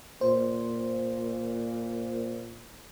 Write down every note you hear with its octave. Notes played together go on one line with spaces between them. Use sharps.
A#2 C5